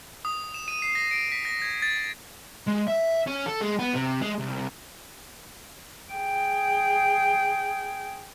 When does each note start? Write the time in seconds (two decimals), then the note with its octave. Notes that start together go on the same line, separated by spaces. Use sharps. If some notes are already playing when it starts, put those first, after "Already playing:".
0.25 D#6
0.54 E7
0.68 D#7
0.82 C7
0.95 A#6
1.11 D7
1.32 B6
1.45 A#6
1.62 G#6
1.82 A6
2.68 G#3
2.88 E5
3.27 C#4
3.46 A4
3.61 G#3
3.79 B3
3.95 C3
4.21 G#3
4.39 C2
6.12 G#4 G5